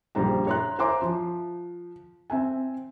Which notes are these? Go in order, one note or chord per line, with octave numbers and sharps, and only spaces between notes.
A#1 C#3 G3 C5 A#5
C#5 E5 A#5 C6 F#6
C5 E5 G#5 A#5 C6 D6
F3
C4 E5 G#5